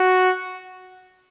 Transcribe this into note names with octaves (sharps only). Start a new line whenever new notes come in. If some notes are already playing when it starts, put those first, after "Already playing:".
Already playing: F#4